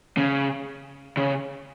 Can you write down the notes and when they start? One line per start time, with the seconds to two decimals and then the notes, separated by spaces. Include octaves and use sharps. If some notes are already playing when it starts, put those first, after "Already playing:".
0.17 C#3
1.17 C#3